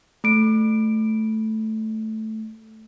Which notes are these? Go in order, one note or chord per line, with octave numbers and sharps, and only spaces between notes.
A3 D7